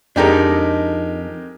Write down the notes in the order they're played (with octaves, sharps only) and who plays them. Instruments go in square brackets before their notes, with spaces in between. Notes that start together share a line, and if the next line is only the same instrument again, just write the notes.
[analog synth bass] F2 [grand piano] G#3 G4 A#4 [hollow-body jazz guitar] D4 D#4 A4